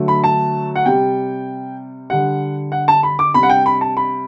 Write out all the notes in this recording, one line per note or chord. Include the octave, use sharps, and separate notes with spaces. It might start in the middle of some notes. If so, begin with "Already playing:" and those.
Already playing: D3 F#3 A3
B5
A5
F#5
C3 G3 G5
D3 G3 F#5
F#5
A5
B5
D6
C3 G3 B5
F#5
G5
B5
A5
B5